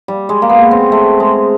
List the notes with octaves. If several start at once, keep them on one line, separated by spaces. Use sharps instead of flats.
G3
G#3
A#3
B3
C4
A3
G#3